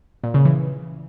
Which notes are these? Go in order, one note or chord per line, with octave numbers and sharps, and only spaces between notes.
A#2
C#3
E3